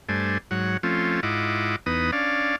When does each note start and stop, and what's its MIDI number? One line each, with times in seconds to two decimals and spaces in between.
0.09 0.38 43
0.09 0.38 57
0.09 0.38 62
0.09 0.38 72
0.09 0.38 80
0.51 0.77 44
0.51 0.77 54
0.51 0.77 73
0.51 0.77 78
0.83 1.20 53
0.83 1.20 57
0.83 1.20 60
0.83 1.20 61
0.83 1.20 65
1.23 1.76 44
1.23 1.76 64
1.23 1.76 65
1.23 1.76 75
1.23 1.76 78
1.23 1.76 86
1.86 2.11 40
1.86 2.11 59
1.86 2.11 63
1.86 2.11 71
1.86 2.11 87
2.12 2.56 61
2.12 2.56 62
2.12 2.56 74
2.12 2.56 77